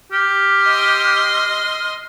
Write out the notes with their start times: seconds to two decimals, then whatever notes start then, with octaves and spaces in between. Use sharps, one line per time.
0.12 G4 F6
0.63 D#5 C6